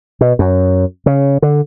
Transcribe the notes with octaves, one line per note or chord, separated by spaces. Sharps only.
B2
F#2
C#3
D3